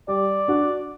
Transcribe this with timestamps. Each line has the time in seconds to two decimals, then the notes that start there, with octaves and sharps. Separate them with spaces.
0.08 G3 D5
0.48 D4 F#4